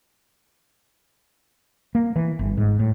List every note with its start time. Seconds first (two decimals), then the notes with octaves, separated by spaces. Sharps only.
1.95 A#3
2.16 E3
2.39 G1
2.57 G#2
2.79 A2